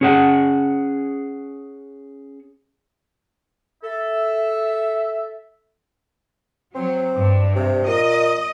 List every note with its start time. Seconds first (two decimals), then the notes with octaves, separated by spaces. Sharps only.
0.01 C#4 G#4 F#5
3.83 A4 E5
6.75 F#3 C4
7.17 G2
7.56 C3
7.87 A#2 D#5